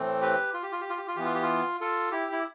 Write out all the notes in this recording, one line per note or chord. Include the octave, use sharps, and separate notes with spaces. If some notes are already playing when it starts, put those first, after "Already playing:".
Already playing: A2 E3 A3 C4
G4 B4
F4
G4
F4
G4
F4
G4
F4
E3 B3 G4
F4
G4
F4
F4 A4
E4 G4
E4